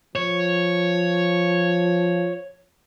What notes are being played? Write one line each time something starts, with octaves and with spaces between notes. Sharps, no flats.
F3 C#5